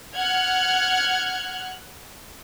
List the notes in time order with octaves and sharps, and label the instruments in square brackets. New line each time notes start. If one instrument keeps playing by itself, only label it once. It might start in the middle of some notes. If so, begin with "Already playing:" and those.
[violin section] F#5 F6 F#6 G#6